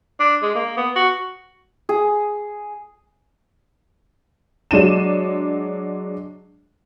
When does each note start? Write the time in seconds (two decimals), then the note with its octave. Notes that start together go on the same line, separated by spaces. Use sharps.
0.20 D4
0.42 G#3
0.55 A#3
0.77 B3
0.96 F#4
1.89 G#4
4.71 F#3 G#3 D4 D#7 E7